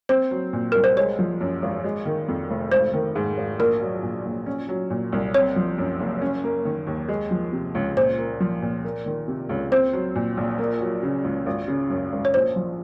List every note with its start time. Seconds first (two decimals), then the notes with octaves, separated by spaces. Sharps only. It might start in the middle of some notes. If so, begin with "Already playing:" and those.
0.09 C4 C5
0.31 F#3
0.53 A#2
0.72 C2 A#4
0.84 C5
0.97 G#3 C#5
1.19 F3
1.41 F#2
1.62 G#1
1.84 G#3
2.06 D#3
2.28 F2
2.50 F1
2.72 G#1 C5
2.93 D#3
3.15 G#2
3.37 G#1
3.59 A#1 A#4
3.81 F#3
4.03 A#2
4.25 A#1
4.46 C#4
4.69 F#3
4.90 A#2
5.12 C2
5.34 C4 C#5
5.56 F3
5.78 F#2
6.00 F#1
6.22 C#4
6.44 A#3
6.65 D#3
6.87 D#2
7.08 G#3
7.31 F3
7.53 C3
7.75 C#2
7.97 A#2 C5
8.18 A#3
8.40 F3
8.62 A#2
8.84 A#3
9.06 D#3
9.28 C3
9.49 C#2
9.72 C4 C5
9.93 F#3
10.15 A#2
10.37 A#1
10.59 A#3
10.80 F#3
11.03 C#3
11.24 C#2
11.46 G#1
11.68 C#3
11.90 F#2
12.12 G#1
12.25 C#5
12.34 A#1 C5
12.56 F3